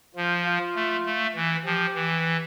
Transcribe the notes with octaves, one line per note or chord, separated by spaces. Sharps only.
F3 F4
F4
A3
A3
E3
F3 G4
E3